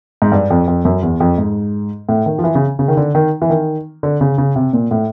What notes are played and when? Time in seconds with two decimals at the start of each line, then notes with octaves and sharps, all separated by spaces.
0.22 G#2
0.32 G2
0.50 F2
0.68 F2
0.85 F#2
1.03 E2
1.20 F2
1.38 G#2
2.09 A2
2.26 D#3
2.39 F3
2.44 E3
2.55 C#3
2.79 C#3
2.88 D#3
2.97 D3
3.15 D#3
3.42 E3
3.50 D#3
4.03 D3
4.21 C#3
4.38 C#3
4.56 C3
4.73 A#2
4.91 A2